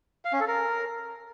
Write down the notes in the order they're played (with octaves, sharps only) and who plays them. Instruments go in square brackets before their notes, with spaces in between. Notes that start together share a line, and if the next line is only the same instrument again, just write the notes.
[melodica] F5
C#4
A4
A#4